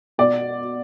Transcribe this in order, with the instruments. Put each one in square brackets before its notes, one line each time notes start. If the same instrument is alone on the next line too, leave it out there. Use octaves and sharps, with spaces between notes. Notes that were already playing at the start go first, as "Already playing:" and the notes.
[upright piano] B2 D5